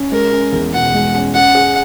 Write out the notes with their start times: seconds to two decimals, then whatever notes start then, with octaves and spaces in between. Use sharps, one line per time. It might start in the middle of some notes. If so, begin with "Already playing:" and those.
Already playing: C#4
0.11 G#3 A#4
0.32 C#4
0.52 E2
0.74 B2 F#5
0.94 G#3
1.15 C#4
1.34 C#4 F#5
1.55 G#4